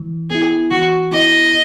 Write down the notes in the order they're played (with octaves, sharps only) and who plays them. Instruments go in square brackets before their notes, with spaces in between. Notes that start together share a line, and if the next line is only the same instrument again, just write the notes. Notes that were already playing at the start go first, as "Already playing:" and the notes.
Already playing: [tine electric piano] E3
[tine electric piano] B3 E4 [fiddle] G#4
[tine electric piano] E3 [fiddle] F#4
[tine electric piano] B3 E4 [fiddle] D#5